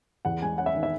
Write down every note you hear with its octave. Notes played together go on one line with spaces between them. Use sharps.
E2 F#5
G#3 G#5
C#4 F#5
E5
D#3
E5